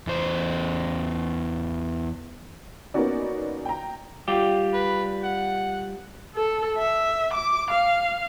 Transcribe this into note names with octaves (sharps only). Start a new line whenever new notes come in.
E2 C5
A#3 B3 C#4 D#4 F#4 D5
G5 A#5
G3 F4 G4
B4
F#5
A4
E5
D6
F5